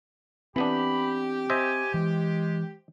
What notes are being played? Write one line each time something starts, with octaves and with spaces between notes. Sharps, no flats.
E3 B3 C4 D4 G4 B5
C5 D#5 E5 G#5
E3 G#3